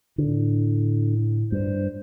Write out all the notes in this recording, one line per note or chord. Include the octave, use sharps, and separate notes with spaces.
A2 D3
G2 C5